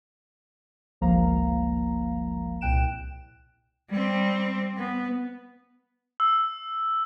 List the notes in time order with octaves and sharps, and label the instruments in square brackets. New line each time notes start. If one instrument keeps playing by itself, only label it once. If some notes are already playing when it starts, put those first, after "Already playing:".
[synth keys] G1 C#2 F3 A#3 F5 A#5
C2 A#2 G5 F#6 D7 E7
[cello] G3 C4
B3
[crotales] E6